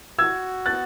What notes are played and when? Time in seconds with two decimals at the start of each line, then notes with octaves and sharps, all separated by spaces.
0.19 F#4 E6 G#6
0.66 B3 F#6 A6